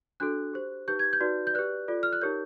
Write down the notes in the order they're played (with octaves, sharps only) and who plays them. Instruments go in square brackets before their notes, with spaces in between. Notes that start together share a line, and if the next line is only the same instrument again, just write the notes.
[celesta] D4 F#4 A4 F#6
G4 C5
D#4 G4 B4 G6
G#6
G6
D#4 F#4 B4 D5
G6
G4 B4 D5 F#6
F4 A4 D5
F6
F#6
D#4 G4 A#4 C#5 G6